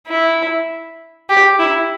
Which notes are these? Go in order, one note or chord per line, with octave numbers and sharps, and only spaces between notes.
E4
G4
E4